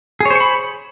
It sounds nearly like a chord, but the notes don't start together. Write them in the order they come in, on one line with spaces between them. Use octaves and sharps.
G#4 C#5 C5 C#6 B5